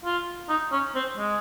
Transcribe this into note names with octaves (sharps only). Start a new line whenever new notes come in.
F4
D#4
C#4
C4
G#3